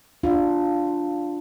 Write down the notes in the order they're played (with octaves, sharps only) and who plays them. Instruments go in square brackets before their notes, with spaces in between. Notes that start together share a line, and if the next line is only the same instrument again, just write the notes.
[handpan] D4 F4